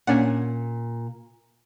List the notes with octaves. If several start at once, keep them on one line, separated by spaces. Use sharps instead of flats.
A#2 C#4 D4 F#5